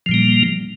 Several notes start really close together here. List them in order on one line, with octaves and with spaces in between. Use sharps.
F3 A#2 G3 A#3